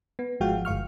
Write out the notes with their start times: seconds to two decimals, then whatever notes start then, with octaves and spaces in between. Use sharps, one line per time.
0.19 B3
0.40 G#1 F3 G#3 F#4 F5 G5
0.65 G1 F5 C#6 F6